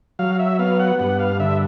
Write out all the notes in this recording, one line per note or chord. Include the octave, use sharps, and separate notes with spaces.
F#3 F5
E5
B3 F5
F#5
G2 F#5
F5
D3 E5